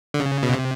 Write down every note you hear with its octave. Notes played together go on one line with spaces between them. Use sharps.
D3
C#3
B2
C3